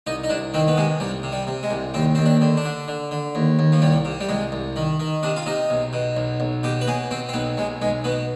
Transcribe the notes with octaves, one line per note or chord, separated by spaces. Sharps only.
C2 D#4
D#4
C2 D4
D#3 C4
B3
C3 G#3
C2 G3
C3
G3
C3
G#3
C2
D#2 C4
D#2 C4
D4
D3
D4
D3
D3
D3
D#2
D#2
F3
C2 G3
C3
G3
C2 G#3
C2
D#3
D#3
C3 D4
F4
C3 D#4
B1
B2
B1
B1
B2 G4
B4
B2 G#4
B2 C4
C4
B1 B3
B1 G#3
B1 G#3
B2 B3